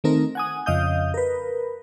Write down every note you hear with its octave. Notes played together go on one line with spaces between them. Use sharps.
D#3 A3 C4 D#4 A#4
F#5 G#5 D#6
F2 C#3 D#5 F5 D#6 G6
A#4 B4